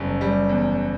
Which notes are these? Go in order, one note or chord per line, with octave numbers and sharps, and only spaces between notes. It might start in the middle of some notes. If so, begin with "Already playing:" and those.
Already playing: F#1 E2 G3
G3
E2